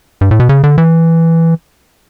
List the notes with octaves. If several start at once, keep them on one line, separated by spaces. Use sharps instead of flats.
G2
A2
B2
C#3
D3
E3